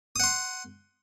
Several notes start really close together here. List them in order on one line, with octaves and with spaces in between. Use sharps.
D#6 F#5 C6